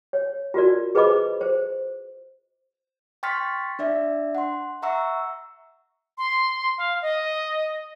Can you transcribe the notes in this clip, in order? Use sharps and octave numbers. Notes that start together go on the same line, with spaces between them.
C#5
F4 F#4 A#4 D5
G#4 B4 C5 D#5 B5 D6
C5
G5 C6 C#6 F6 A6 B6
D4 D5 E5
F#5 C6
E5 F#5 A#5 C#6 E6
C6
F5
D#5